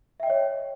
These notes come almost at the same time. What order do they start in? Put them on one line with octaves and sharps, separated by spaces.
E5 G5 D#5 C#5